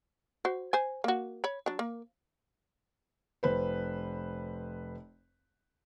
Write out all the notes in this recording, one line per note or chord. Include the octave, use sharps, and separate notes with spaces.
F#4 C5
C5 G#5
A#3 F#4
C#5 B5
F#3 D4
A#3
F1 B4 C5